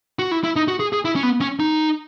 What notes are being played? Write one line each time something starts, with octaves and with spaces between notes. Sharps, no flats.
F#4
E4
E4
D#4
F#4
G#4
G#4
E4
C#4
B3
C#4
D#4